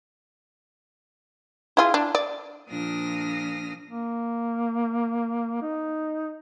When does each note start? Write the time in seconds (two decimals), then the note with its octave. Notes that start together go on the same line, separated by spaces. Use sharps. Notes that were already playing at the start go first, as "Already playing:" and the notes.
1.77 E4 F4 G#4
1.94 D4
2.15 D5
2.69 A#2 F3 D4 D#6 F6 A#6
3.90 A#3
5.62 D#4